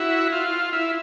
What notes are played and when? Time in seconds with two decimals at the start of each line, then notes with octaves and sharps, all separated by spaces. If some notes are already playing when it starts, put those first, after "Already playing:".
Already playing: E4 F#4
0.32 F4
0.73 E4